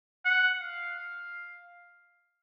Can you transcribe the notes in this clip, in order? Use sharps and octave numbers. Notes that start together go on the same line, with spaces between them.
F#5
F5